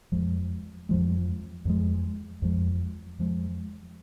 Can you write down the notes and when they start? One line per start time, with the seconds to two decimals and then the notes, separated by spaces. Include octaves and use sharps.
0.12 F2 F3 G#3
0.89 F2 F3 G#3
1.65 F2 F3 G#3
2.42 F2 F3 G#3
3.19 F2 F3 G#3